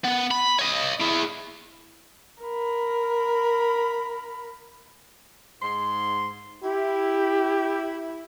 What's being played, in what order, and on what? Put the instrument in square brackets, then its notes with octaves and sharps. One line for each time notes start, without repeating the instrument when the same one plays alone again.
[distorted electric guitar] B3
B5
C#5 D#5
E4 G#4
[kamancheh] A#4 B5
[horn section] G#2 C6
[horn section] E4 [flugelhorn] G4